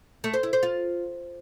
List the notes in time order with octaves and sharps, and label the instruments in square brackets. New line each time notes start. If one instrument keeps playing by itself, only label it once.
[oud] A3
C5
E4
C5
F4